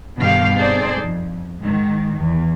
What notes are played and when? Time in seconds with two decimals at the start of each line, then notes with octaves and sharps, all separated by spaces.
0.18 G2 B2 D3 D#3 G4 F5
0.56 C4 D#4 G#4 A4 C5 D5
1.00 F2
1.60 G#2 D#3
2.18 E2